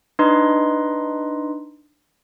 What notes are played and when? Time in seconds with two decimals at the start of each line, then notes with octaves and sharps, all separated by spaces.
0.19 D4 D#4 B4 D#5 C6